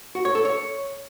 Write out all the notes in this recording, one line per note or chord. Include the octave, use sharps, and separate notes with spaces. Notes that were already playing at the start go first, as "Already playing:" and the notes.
F#4
C#5
A4
C#5